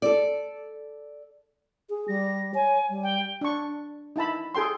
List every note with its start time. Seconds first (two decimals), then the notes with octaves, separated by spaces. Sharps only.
0.02 A4 D5
1.89 G#4
2.08 G3 A#6
2.54 C#5 G#5
2.89 G3
3.03 G5
3.41 D4 C#6
4.16 D#4 E4 A5 B5
4.55 G#4 A4 G5 C6